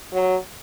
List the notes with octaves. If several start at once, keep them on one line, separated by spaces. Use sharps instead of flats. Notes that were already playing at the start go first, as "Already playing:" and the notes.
F#3